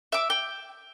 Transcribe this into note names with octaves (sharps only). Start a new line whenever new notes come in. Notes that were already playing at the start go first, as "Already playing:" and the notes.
E5 D6
G5